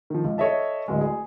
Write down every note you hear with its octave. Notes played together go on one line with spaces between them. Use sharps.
D#3 F3
C#2
A4 C#5 D#5 E5 A5
D1 G#3
G#4